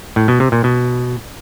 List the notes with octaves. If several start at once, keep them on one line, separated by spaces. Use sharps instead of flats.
A2
B2
C3
A#2
B2